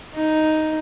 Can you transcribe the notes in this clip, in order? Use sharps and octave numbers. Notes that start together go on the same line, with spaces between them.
D#4